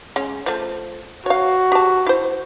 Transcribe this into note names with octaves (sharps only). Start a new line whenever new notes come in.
G#3 C#4
F3 A3
F#4 C#5 F5
G4 A5
E4 C5